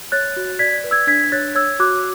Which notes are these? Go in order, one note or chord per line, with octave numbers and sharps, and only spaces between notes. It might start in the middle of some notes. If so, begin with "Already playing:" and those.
C#5 F#6 A6
F#4
D5 G#6 B6
B4
E6 G#6
D4 G#6 B6
C#5 F#6 A6
C#5 E6 G#6
F#4 D6 F#6